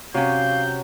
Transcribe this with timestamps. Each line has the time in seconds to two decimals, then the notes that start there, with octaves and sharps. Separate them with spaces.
0.14 C3 F#3 C#4 F5 G6